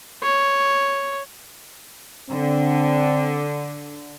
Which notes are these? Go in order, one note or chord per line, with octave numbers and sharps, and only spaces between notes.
C#5
D3 C4